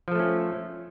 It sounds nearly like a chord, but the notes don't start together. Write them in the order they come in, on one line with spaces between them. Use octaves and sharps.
F3 A4 A3 C#4